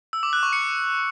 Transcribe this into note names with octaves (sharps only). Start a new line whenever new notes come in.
E6
D6
F#6
C#6
C#7